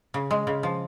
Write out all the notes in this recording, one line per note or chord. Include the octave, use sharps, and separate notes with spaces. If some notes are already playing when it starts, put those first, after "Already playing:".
C#3
G#3
C#3
F3